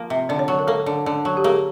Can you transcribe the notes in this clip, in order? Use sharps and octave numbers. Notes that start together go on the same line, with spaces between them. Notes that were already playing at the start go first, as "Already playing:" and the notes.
Already playing: F3 A#3
C3
D3 D5
C#5
F#3
A#4
A#3 A4
D3
D3
F#3
G4
A#3 G#4